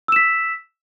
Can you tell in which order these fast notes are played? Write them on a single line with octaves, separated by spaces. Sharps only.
E6 E7 B6